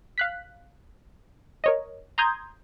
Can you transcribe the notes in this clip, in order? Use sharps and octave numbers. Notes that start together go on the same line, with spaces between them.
F5 F#6 B6
A#4 C#5 D#5
A#5 C6 D#6 G6 G#6